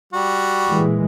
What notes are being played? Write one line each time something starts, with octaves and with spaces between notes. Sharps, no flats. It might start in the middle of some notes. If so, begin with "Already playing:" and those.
G3 F#4
A#2 E3 G#3